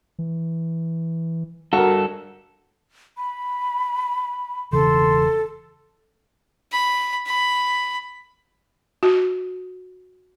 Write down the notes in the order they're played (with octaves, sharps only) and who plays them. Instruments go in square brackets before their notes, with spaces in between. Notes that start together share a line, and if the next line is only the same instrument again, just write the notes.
[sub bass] E3
[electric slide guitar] G2 A4 [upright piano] F#4 A#4
[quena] B5
[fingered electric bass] E1 C#3 E3 [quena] A4 [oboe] C6
[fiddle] B5
B5
[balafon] F#4